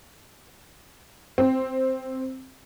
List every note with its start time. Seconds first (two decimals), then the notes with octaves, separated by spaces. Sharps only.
1.38 C4